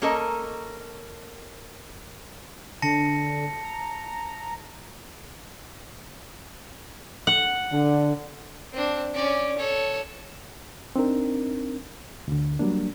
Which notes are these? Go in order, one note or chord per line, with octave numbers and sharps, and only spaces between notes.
A#3 C#4 A4 A#4 D#5
D3 A5 A#6 C#7
A#5
F#5
D3
C4 D4
C#4 D5
A4 C#5
C4 D4 D#4 A#4
D2 D3
F#3 G3 A#3 D4